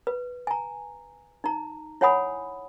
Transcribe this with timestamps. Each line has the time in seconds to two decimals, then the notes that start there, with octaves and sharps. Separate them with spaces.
0.07 B4
0.47 G#5 A#5
1.44 D#4 A#5
2.01 E4 C#5 F#5 G#5 B5 D#6